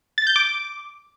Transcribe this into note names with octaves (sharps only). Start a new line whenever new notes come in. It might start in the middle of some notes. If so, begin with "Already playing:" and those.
A6
G6
D6